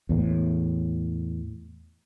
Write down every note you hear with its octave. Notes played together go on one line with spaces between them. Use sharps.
E2 A2